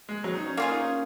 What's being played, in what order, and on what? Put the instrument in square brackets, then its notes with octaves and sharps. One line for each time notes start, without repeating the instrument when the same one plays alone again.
[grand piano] G#3
F#3
D#4
C#4
[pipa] A#3 F4 G#4 [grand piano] C#4
[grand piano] D#4
C#4